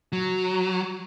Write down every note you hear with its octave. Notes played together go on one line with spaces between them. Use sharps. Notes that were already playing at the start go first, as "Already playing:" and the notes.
F#3